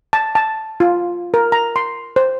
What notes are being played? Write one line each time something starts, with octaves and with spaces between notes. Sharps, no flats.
A5
A5
F4
A#4
A#5
C6
C5